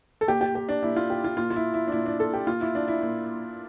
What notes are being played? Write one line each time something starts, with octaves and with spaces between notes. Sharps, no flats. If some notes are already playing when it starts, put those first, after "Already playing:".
A4
A#2 G4
G4
G4
D4
A#2 E4
F4
G4
F4
A#2 F4
F4
E4
E4
D4
A#2 E4
D4
A4
G4
A#2 F4
E4
D4
E4
A#2